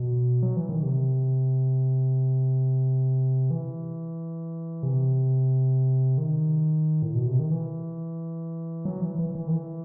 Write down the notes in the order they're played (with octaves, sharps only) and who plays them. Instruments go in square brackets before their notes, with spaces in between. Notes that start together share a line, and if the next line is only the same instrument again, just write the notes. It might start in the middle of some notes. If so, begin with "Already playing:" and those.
Already playing: [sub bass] B2
F#3
E3
D#3
C3
E3
C3
D#3
A2
B2
C3
D#3
E3
F#3
E3
E3
E3
D#3
E3